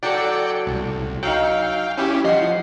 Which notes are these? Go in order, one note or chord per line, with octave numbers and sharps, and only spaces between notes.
F#3 F#4 A4 D5 G5 C#7
C2
F#3 D#4 F5 G5
C#4 E4 G4
F3 D#5 F#5 C7